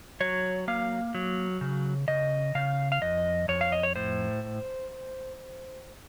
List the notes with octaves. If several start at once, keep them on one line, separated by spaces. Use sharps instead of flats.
F#3 C#5
A#3 F5
F#3
C#3
C#3 D#5
C#3 F5
F5
F2 D#5
F2 C#5
F5
D#5
C#5
A2 C5